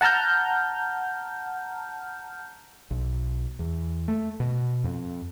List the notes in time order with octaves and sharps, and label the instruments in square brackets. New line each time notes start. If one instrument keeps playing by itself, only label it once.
[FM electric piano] F#5 A5 A#5 F6 G6
[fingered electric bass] B1
E2
A3
B2
F2